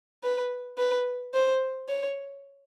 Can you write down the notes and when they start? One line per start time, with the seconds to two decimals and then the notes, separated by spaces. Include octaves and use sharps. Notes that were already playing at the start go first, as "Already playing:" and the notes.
0.23 B4
0.78 B4
1.34 C5
1.89 C#5